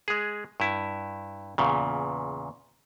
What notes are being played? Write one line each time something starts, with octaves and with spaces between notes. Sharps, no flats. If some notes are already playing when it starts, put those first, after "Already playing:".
G#3 G#4
G2 E4
E2 A#2 C#3